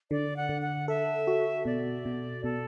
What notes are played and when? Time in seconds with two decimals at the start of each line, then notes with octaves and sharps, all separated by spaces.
0.11 D3 D5
0.37 F#5
0.49 D3
0.62 F#5
0.88 A4 E5
1.27 F#4
1.65 B2 D5
2.05 B2
2.44 B2 A4